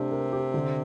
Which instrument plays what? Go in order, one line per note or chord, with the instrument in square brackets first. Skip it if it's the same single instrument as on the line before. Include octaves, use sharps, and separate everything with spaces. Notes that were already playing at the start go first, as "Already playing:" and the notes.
Already playing: [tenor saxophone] C3 [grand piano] A3 D4 G4
[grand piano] A#4
G4
D3